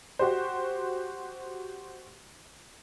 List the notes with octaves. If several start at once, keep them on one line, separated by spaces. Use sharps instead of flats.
F#4 G4 C5